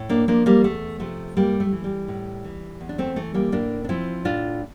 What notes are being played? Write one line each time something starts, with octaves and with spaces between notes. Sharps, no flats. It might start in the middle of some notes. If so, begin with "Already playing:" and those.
Already playing: A2
A#3 D4
F3 A#3 D4
G3 A#3
E2 A3
C3 F3 A3
G2 G3 A#3
A3
E3
G3
A2
E3
E2
D4
A3 C4
E3 A3
G3 A#3
A2 A#3 D4
D4
F3 C4 E4
A2 D4 F4